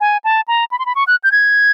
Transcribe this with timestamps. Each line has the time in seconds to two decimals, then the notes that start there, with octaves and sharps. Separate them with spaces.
0.01 G#5
0.24 A5
0.48 A#5
0.72 B5
0.79 C6
0.86 B5
0.95 C#6
1.07 F#6
1.24 G6
1.32 G#6